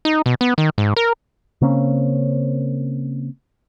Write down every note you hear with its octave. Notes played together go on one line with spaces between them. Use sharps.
D#4
B2
B3
D#3
G#2
A#4
C#3 A#3 C4 C#4